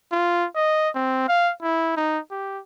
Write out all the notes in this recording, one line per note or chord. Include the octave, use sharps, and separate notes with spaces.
F4
D#5
C4
F5
E4
D#4
G4